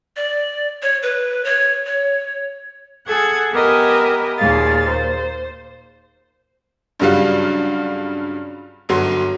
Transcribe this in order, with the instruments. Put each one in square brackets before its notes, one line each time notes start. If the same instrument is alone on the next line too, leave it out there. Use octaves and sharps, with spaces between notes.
[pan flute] D5
C#5
B4
C#5
C#5
[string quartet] G#4 A4 F#5 G#6
B3 G4 A#4 D#5 E5 G#5
D#2 A#2 G#4 F5 A6
C5
[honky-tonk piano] G2 C#3 F#3 G3 F4
G1 F#3 C6